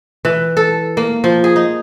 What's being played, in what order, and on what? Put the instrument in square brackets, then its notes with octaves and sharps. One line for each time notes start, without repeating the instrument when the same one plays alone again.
[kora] E3
A4
A#3
F3
G#4
D#4